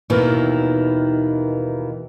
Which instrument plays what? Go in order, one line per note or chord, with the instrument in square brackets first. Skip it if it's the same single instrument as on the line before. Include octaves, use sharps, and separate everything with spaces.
[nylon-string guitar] D#2 B2 D#3 E3